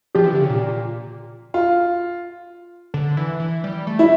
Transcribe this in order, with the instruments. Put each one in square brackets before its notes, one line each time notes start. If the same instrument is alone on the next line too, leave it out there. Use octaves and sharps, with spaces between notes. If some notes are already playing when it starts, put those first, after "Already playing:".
[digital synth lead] F3 [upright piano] G4
[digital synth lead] E3
D3
C#3
A#2
[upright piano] F4
[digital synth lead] D3
E3
E3
G3
A3
[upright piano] E4